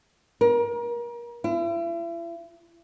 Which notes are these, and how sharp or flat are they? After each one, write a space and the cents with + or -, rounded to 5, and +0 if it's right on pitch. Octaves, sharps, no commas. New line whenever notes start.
A#4 +30
E4 +40